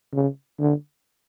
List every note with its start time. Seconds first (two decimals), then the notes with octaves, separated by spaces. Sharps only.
0.13 C#3
0.59 D3